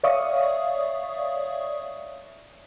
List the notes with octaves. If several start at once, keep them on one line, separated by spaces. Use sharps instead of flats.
C#5 D5 E5 F5 C#6 D#6